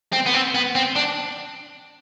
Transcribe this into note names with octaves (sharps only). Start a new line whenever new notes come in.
C4
B3
C4
B3
C4
D4